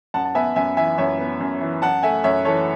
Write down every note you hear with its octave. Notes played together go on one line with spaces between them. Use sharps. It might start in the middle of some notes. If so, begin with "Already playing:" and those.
F#2 F#5 A5
A5
B3 E5 G#5
F#2 E5 G#5
E3 E5 G#5
F#2 C#5 E5
B3
F#2
E3
F#2 F#5 A5
A3 E5 G#5
F#2 C#5 E5
E3 A4 C#5